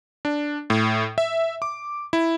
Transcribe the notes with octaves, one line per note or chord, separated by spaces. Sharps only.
D4
A2
E5
D6
E4